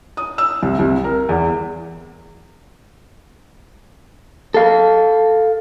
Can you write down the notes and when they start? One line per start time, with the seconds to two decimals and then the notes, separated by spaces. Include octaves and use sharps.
0.17 D#6
0.38 E6
0.62 C2
0.79 C2
1.04 A#4
1.29 E2
4.54 A4 F5